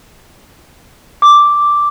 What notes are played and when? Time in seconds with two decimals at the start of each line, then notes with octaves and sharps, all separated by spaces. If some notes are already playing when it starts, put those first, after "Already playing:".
1.22 D6